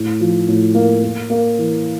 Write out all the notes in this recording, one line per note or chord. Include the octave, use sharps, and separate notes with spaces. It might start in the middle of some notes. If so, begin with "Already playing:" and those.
Already playing: A2
F3
A2
A#3
A#3
A#3
E3